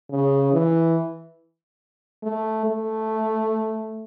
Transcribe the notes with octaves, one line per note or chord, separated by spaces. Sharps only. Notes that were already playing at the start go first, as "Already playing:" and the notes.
C#3
E3
A3
A3